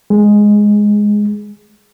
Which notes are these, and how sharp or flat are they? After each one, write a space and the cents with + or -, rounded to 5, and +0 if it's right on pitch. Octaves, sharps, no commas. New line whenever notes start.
G#3 +0 G#4 +0